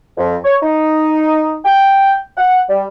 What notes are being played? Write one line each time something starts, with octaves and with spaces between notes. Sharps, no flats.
F2
C#5
D#4
G5
F#5
G3